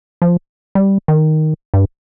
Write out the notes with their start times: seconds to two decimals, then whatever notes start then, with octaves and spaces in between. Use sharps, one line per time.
0.22 F3
0.75 G3
1.08 D#3
1.74 G2